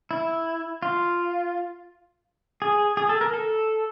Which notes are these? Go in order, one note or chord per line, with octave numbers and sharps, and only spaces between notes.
E4
F4
G#4
G#4
A4
A#4
A4